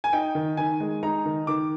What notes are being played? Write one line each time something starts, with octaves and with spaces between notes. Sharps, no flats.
G#5
D#4 G5
D#3
D#3 G#5
G#3
D#4 A#5
D#3
D#3 D6